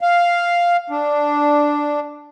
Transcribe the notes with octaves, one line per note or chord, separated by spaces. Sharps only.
F5
D4